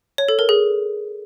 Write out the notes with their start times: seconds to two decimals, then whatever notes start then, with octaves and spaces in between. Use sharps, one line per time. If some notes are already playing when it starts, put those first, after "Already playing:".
0.18 C#5
0.28 A4
0.39 A#4
0.49 G#4